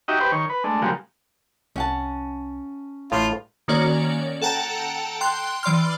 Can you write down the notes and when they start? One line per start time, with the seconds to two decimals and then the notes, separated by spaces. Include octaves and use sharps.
0.08 D#4 F#4 G4 D#5 E5
0.20 G4 B4 C5
0.32 D#3 C#5
0.50 B4
0.64 G#3 A3 D4
0.82 C#3 F3 G3 G#3 A#3 F#4
1.76 C2 C#4 F#5 A5
3.12 A1 A2 F4
3.68 D#3 A#3 C#4 F#4 C#5 D5
4.42 A4 F#5 G5 A5 A#5
5.21 G5 C6 F#6
5.63 E3 D5 C6 F6